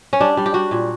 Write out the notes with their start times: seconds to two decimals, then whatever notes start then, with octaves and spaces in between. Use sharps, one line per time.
0.13 C#4
0.21 G3 D4
0.37 G3
0.46 G4
0.54 G3 F#4
0.71 A#2